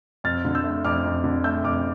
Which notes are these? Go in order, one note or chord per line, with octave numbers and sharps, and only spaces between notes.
F2 F6 A6
D3
E6 G6
A3
F2 D6 F6
F2
D3
A3 E6 G6
F2 D6 F6